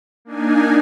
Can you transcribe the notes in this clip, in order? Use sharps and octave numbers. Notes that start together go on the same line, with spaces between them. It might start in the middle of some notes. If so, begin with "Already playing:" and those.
A#3 D4 D#4 G#5